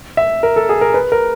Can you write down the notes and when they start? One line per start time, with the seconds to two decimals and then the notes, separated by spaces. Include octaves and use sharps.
0.17 E5
0.43 A#4
0.56 A4
0.69 G#4
0.81 A#4
0.94 B4
1.12 A#4